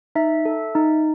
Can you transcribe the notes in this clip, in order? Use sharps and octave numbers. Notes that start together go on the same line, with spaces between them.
D#4 E5
A4
D#4